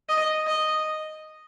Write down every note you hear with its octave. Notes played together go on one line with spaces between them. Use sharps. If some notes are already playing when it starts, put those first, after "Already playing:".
D#5
D#5